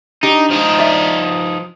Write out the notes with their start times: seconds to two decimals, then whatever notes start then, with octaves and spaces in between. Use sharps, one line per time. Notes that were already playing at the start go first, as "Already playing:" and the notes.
0.23 D4 D#4 G4
0.51 F3 D#4
0.78 D5 E5